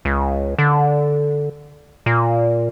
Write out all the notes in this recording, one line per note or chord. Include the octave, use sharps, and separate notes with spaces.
C#2
D3
A#2